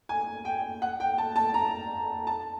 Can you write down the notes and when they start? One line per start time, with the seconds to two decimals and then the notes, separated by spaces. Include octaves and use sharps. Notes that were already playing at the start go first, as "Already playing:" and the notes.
0.09 G#5
0.45 G5
0.82 F#5
1.00 G5
1.18 A5
1.36 A5
1.54 A#5
2.27 A5